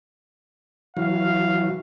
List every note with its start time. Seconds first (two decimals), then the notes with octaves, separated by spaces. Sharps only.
0.97 E3 F#3 F5